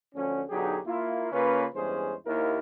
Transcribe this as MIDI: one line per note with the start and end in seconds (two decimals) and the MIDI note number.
0.15 0.43 38
0.15 0.43 50
0.15 0.43 53
0.15 0.43 61
0.50 0.78 35
0.50 0.78 50
0.50 0.78 54
0.50 0.78 63
0.50 0.78 67
0.50 0.78 68
0.86 1.29 58
0.86 1.29 64
0.86 1.29 65
1.32 1.64 49
1.32 1.64 58
1.32 1.64 61
1.32 1.64 65
1.32 1.64 71
1.74 2.13 40
1.74 2.13 43
1.74 2.13 56
1.74 2.13 61
1.74 2.13 68
1.74 2.13 72
2.26 2.59 39
2.26 2.59 64
2.26 2.59 70